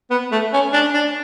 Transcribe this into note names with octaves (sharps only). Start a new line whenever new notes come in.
B3
A3
C#4
D4
D4